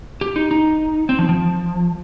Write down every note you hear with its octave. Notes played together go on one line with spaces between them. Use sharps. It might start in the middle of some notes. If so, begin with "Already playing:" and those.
G4
D#4
D#4
C4
F3
F3